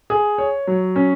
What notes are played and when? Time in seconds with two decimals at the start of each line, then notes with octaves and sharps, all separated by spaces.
0.10 G#4
0.38 C#5
0.67 F#3
0.96 C#4